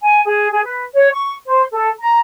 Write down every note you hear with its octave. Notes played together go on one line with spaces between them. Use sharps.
G#5
G#4
G#4
B4
C#5
C#6
C5
A4
A#5